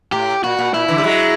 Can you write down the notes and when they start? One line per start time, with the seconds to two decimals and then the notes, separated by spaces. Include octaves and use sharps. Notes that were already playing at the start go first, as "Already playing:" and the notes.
0.12 A2 G4
0.44 A#2 F#4
0.59 A#2
0.74 A#2 E4
0.88 D3 E3
0.98 G3
1.03 F#3 G#3